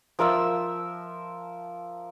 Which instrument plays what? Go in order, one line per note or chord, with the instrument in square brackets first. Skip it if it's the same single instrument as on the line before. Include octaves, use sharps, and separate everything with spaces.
[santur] F3 A#4 E5 E6